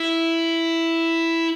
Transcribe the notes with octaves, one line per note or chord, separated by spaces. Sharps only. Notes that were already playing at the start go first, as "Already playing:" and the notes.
Already playing: E4